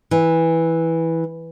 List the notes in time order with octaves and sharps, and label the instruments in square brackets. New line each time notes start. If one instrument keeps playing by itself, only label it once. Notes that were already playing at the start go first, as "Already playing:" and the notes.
[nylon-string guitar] E3